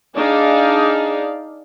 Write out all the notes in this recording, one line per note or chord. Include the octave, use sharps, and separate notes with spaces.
D4 D#4 G#4 D5 F5